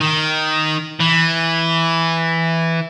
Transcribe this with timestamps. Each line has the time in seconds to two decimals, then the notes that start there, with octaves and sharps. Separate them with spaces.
0.01 D#3
1.00 E3